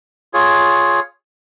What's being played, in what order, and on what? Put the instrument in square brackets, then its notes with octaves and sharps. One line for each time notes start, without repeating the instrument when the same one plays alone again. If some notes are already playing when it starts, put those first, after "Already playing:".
[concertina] F4 G#4 C#5